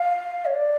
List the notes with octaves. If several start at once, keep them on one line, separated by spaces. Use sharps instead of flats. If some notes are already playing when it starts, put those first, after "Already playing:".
Already playing: F5
C#5
D5